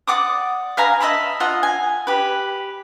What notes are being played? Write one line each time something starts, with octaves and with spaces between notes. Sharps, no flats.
D5 F#5 D6 D#6
B4 F5 G#5 A#5
D#5 E5 A5 B5
F4 D#5 F#5
G#5
G4 B4